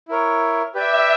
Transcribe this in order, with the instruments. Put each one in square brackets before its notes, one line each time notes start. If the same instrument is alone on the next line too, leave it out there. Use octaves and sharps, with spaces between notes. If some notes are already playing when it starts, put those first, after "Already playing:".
[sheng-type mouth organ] E4 A#4 C#5
[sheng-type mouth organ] G4 B4 D5 G5 [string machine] E5